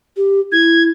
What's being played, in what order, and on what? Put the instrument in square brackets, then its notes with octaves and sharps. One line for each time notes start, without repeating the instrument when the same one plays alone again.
[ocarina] G4
[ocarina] E4 [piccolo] G#6